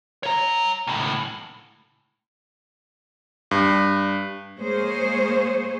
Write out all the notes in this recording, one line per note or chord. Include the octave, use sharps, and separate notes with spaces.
C#5 A#5
C#2 A2
G2
G#3 A#3 G#4 C5 C#5